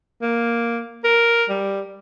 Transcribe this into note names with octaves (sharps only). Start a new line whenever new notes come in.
A#3
A#4
G3